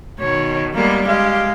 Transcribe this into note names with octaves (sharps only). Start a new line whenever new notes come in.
B2 D#3 C#5
G3 G#3 A#3 B3
G#3 G4 F5